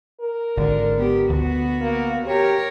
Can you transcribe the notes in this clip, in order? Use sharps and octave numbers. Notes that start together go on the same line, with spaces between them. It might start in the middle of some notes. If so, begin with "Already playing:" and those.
A#4
G#1 D3
B3 G4
D2 B3 F#4
A#3
G4 A#4 C#5